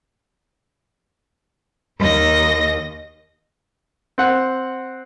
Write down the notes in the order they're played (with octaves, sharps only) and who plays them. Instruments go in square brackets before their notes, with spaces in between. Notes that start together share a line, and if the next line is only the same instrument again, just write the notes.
[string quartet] D#2 D#5 A#6
[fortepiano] C4 F#5